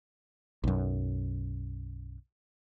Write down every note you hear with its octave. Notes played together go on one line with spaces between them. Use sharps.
B1 F#2